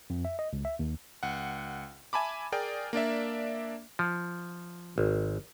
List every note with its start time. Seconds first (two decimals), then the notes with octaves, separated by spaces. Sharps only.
0.10 F2
0.25 E5
0.39 D#5
0.53 C#2
0.65 E5
0.79 D#2
1.23 C#2 F#5
2.13 E5 G#5 A5 B5 D6
2.52 G#4 A#4 D5 G5
2.93 A#3 D4 D5 E5
3.99 F3
4.98 G#1